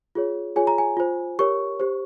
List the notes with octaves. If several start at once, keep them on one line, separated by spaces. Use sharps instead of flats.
F4 G#4 C#5
F4 G#4 C#5 G#5
A#5
G#5
F4 C5
G4 A#4 C#5 C#6
G4 C5